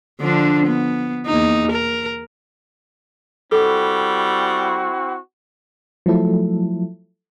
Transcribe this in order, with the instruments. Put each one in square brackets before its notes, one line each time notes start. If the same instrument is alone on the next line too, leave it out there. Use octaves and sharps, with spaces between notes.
[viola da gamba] D3 F3 D4
B3
E2 A#3 D#4
A#4
[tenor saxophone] G3 [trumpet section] C4 E4 F#4 [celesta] A4
[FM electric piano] F3 F#3 A3 E4 A4